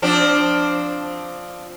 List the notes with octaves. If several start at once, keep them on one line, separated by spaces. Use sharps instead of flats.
F3 C4 D4